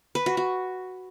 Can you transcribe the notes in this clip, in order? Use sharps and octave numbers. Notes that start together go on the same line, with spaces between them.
B4
F#4
F#4